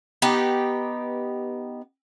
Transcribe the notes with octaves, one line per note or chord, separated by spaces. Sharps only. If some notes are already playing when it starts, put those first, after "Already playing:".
B3 D#4 G4